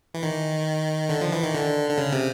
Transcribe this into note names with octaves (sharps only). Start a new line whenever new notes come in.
E3
D#3
D3
F3
E3
D#3
D3
D3
C#3
C3